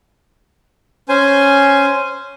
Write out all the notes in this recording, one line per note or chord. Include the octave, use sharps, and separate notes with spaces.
C#4 C5 G#5